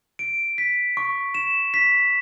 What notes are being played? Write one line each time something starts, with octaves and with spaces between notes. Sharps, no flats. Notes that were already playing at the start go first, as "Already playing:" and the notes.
D7
B6
C#6
E7
B6